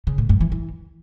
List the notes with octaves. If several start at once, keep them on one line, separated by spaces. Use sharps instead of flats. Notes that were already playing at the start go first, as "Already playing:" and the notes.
C#3
A2
G2
E3
E3